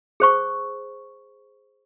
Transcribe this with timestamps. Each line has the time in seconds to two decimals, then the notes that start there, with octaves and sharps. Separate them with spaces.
0.20 G#4 C5 C#6